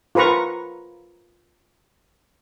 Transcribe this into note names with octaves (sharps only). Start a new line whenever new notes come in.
F4 A#4 B4 A#5 C#6